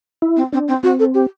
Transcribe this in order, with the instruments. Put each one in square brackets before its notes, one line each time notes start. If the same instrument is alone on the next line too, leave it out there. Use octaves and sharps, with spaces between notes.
[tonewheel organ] E4
[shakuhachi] C4
[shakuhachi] C4 [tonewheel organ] D4
[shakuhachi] C4
[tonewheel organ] C4 [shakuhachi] F#4
[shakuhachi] A4
G4